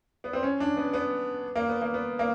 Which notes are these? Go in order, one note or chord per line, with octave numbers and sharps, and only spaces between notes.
B3
C4
C#4
D4
B3
B3
A#3
B3
A#3
B3
A#3